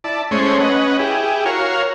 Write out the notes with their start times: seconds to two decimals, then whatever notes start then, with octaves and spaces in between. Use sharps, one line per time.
0.04 E4 D5 A5
0.31 G#3 A3 C#4 C5 C#5
0.60 C#4 B4 D#5 F#5
0.99 E4 G4 G#4
1.45 F#4 A#4 C#5 F5